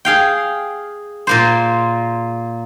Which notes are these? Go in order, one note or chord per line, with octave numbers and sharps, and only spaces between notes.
G#4 F5 G5
A#2 A#3 C5